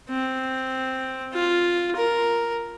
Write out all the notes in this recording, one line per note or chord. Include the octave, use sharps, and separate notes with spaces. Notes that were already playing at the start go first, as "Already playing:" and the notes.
C4
F4
A#4